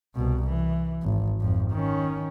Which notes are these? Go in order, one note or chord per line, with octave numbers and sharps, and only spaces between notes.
C2 B2
E3
G#1
G#1 F2
D#3 C#4